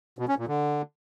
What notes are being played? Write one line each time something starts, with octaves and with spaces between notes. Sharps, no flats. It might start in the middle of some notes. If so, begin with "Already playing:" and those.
B2
C#4
A#2
D3